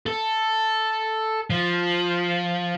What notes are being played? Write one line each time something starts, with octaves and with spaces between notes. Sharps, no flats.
A4
F3